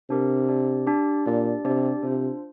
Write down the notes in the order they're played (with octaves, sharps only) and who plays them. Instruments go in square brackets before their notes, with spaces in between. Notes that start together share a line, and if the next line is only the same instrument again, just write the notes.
[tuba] C3 [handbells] D4 G4 A#4 D5
[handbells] D4 G4 D5
D4 G4 D5
[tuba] A#2 [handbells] D4 G4 D5
[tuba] C3 [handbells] D4 G4 D5
[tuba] C3 [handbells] D4 F4 C5